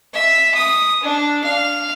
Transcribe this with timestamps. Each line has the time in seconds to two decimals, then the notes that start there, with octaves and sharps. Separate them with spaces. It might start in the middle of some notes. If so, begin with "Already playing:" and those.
0.14 E5
0.55 D#6
1.03 D4
1.44 F5